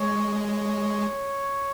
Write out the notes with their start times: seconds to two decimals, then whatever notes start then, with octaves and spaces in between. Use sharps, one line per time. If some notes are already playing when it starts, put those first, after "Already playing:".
Already playing: G#3 C#5
0.50 C#5